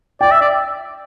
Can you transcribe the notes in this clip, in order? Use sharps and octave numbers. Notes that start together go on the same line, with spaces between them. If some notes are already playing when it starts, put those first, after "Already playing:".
D5 G5
E5
D5